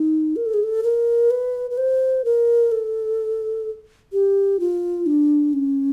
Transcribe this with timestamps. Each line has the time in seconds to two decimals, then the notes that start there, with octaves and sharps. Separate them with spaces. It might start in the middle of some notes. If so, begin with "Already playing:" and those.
Already playing: D#4
0.36 A#4
0.46 A4
0.54 G#4
0.63 A4
0.83 A#4
1.31 B4
1.71 B4
1.78 C5
2.25 A#4
2.72 A4
4.13 G4
4.60 F4
5.06 D4
5.53 C#4